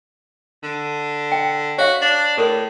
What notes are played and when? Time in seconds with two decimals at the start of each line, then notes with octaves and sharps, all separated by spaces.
0.63 D3
1.32 G5
1.78 F#4 C#5 F5
2.02 D4
2.37 A2 G#4 A#4 D#6